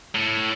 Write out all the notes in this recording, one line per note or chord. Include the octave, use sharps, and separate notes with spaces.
A2